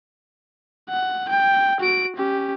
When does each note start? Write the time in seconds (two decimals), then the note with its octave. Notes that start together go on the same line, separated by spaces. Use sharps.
0.89 F#5
1.29 G5
1.80 F#4 D7
2.16 C#4 G4